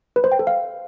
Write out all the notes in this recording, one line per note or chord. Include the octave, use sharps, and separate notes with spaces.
B4
C5
G5
A4
F5